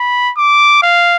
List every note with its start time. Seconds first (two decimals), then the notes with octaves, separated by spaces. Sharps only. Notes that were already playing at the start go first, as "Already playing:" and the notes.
Already playing: B5
0.37 D6
0.83 F5